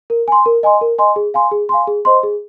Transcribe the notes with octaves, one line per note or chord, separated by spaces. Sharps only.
A#4
G#5 C6
A#4
D#5 G#5 C6
A#4
D#5 G#5 C6
G#4
F5 G#5 C6
G#4
F5 G#5 C6
G#4
C5 D#5 C6
G#4